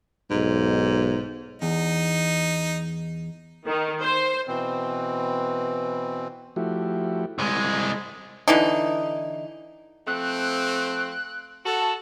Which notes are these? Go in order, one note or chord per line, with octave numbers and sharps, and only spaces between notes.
B1 G#2
E2 D#4
D#3
C5
B2 E3 C4
F3 A3 E4 F#4 G4
C2 G#3
D3 E3 D#4
F3 A3 C4 F#6
F#4 A4 A5